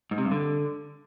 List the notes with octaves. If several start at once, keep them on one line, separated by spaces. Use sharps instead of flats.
G#2
C3
G2
D3